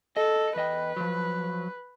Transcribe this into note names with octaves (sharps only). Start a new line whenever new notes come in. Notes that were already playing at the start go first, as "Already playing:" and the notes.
A4 D#5
E2 B4 D#5 G5
F3 F#3